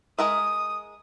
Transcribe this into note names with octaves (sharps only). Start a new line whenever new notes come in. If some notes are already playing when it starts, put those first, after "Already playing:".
G#3 A#4 E5 D#6